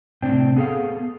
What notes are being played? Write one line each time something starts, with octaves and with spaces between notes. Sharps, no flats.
A2 C3 C4 D4 G5
B3 G#4 A4 F5